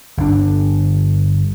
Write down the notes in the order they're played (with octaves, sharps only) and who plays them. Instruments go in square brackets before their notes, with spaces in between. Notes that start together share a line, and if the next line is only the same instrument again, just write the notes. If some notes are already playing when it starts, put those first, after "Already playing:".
[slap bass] G1 D4